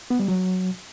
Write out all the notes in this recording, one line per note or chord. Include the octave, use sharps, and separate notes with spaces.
B3
G3
F#3